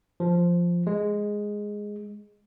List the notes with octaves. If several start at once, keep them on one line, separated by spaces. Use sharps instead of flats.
F3
G#3